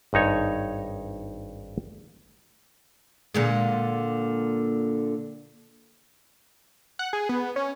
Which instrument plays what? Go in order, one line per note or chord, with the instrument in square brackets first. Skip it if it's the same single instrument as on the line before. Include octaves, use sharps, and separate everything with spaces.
[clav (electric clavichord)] G#1 G2 D#4 C#5 A#5
[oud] A#2 D3 G#3
[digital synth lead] F#5
G#4
B3
C#4